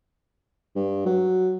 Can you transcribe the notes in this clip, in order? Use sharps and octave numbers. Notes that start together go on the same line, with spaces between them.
G2
F#3